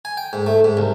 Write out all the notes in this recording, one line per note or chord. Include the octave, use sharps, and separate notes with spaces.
G#5
G5
G#2
A3
G#2
C2